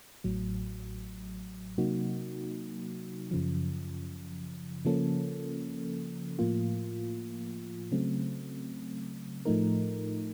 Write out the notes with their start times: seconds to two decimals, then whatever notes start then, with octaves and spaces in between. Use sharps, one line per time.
0.24 A1 A2 F#3
1.78 C3 F#3 A#3 D#4 F#4
3.31 F#2 C#3 F3
4.85 C#3 F3 A#3 C#4 A4
6.39 A2 F3 A#3 F4
7.92 C#3 F#3 A3 C4
9.45 A2 F3 A3 D#4 A#4